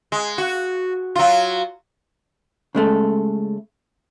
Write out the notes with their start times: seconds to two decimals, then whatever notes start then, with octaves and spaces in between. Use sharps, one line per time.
0.12 G#3
0.38 F#4
1.16 F#3 F4
2.75 C#3 G#3 A3 A4